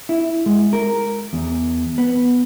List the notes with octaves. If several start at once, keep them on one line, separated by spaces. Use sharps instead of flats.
E4
G#3
A#4
E2
B3